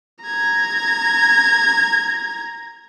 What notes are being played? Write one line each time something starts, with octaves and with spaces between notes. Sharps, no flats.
A#5 G#6